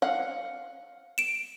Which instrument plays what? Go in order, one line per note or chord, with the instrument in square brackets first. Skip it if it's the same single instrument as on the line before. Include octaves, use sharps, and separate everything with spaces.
[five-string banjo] F5 F#5
[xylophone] D7 E7